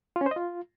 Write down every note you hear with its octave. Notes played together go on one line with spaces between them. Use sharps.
F4
C#4
C5
D#5
F4